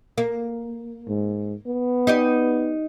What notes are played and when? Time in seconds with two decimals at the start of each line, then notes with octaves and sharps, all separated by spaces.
0.18 A#3
1.08 G#2
1.67 B3
2.07 D#4 G4 D5